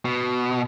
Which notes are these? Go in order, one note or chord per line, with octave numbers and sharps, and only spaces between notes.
B2